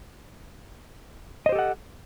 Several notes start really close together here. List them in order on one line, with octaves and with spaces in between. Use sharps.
D#5 C5 G4 A4 F#5